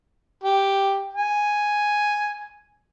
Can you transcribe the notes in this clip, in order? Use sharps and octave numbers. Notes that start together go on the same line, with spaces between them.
G4
G#5